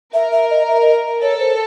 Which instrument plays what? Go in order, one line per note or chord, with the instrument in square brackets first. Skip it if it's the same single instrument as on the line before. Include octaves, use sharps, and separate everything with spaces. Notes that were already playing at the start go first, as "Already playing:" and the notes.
[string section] A#4 [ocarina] E5
[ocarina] E5
D#5
E5
D#5
[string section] A4 [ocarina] C#5
[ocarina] C5